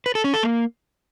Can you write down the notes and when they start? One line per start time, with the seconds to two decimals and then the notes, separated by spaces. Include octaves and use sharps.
0.06 B4
0.15 A4
0.24 C#4
0.34 A4
0.43 A#3